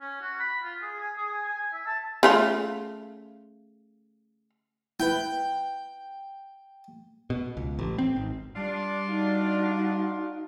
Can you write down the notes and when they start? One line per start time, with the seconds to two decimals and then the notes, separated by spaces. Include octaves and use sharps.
0.01 C#4
0.21 F#4
0.40 B5
0.64 F4
0.82 G#4
1.00 G#5
1.18 G#4
1.31 G#5
1.45 G#5
1.58 G#5
1.73 E5
1.86 A5
2.23 C#3 A3 F4
5.00 E4 B4 G5
7.30 B2
7.57 C#2
7.79 A1
7.98 C4
8.16 G#1
8.56 G3 D4 F4
9.07 D#4 F#4 F5